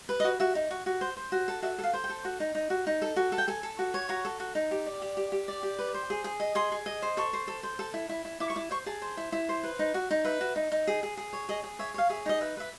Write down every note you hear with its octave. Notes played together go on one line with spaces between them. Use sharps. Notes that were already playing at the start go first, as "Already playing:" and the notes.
B4
D#5
F#4
F#4 E5
D#4
F#4
F#4
C5
C5
F#4
A4
F#4 E5
A4
F5
C5
G5
A4
F#4
D#4
D#4
F#4
D#4
A4
F#4
A4
G5
A4 G#5
A4
F#4
C#5
F#4 A#5
A4
F#4
D#4
G4
D5
G4
G4
G4
D5
G4
B4
C5
G#4
G#4
D#5
G#4 C6
G#4
D#5
C5
A4 C#6
C5
A4
C5
A4
E4
E4
E4
E4 D6
C#6
E4 D6
C5 C#6
G#4 A5
C5
E4
E4
C5
B4
D#4
F#4
D#4
B4 E5
F#4
D#4
D#4
G#4
G#4
G#4
C#5
G#4 D#5
G#4
C#5 E5
C#5 F5
G#4 E5
D#4 D#5
B4 E5
B4 E5